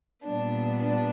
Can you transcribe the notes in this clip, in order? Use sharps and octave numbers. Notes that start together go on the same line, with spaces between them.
A#2 G3 B3 D4
D4